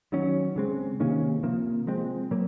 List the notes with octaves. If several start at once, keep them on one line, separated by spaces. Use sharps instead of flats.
D#3 F#3 C#4
C#3 G#3 C4
C3 D#3 A#3 C#4
C3 F3 A#3
F3 G#3 C4
A#2 F#3 A#3